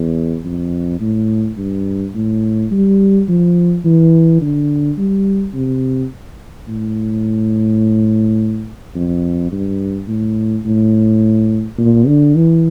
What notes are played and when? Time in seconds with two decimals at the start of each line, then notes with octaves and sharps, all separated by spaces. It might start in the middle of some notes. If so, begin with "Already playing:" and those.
Already playing: E2
0.44 F2
1.00 A2
1.57 G2
2.14 A2
2.71 G3
3.28 F3
3.85 E3
4.41 D3
4.97 G3
5.54 C3
6.68 A2
8.95 F2
9.51 G2
10.08 A2
10.65 A2
11.78 A#2
12.07 D3
12.35 E3